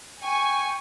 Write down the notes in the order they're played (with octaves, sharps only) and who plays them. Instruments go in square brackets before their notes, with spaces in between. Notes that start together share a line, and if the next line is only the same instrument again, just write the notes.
[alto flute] G5 [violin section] G#5 [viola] C#6